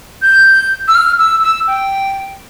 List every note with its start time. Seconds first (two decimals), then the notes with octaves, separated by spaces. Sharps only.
0.22 G6
0.88 E6
0.95 F6
1.18 E6
1.43 E6
1.67 G5